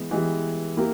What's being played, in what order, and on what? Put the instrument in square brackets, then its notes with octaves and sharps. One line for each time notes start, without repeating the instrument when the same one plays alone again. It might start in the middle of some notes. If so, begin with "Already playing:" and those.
Already playing: [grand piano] E3 G#3 B3
E3 G#3 B3 G4
A#3 E4 G4 A#4